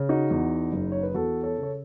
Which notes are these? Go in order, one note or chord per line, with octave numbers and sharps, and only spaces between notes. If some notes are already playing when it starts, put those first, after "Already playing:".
Already playing: C#3
D#4 F#4
E2
F#1
C#5
B4
E2 F#4 A4
A4 C#5
C#3
C#5